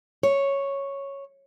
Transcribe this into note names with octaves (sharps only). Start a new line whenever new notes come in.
C#5